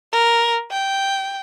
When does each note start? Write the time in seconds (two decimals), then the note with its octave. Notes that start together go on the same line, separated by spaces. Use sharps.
0.12 A#4
0.71 G5